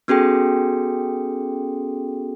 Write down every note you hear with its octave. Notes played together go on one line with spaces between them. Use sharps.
B3 C#4 F#4 G#4 A4 G5